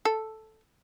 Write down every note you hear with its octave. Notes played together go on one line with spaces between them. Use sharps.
A4